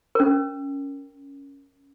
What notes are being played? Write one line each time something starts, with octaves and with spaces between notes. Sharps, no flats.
C#4 A#4